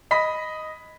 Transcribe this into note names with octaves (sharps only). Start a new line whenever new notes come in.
D#5 B5 B6